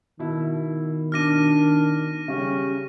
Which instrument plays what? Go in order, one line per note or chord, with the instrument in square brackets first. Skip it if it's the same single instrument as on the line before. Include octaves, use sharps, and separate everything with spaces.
[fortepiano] B2 E4 [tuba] D#3
[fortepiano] B2 D6 [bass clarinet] D4 [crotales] F6 A#6 D#7
[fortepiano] C#3 G3 [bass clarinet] C#4